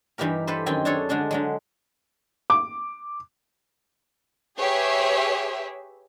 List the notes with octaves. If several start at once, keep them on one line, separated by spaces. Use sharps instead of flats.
G2 E3 D#4 G4 A#4
G4 A4 B4 C5
F#2 D#3 C4 G5 G#5
D4 G#4 A4 C#5
D3 G#3 D4 G#4
D3 F#3 G#3
D6
G4 G#4 B4 C#5 E5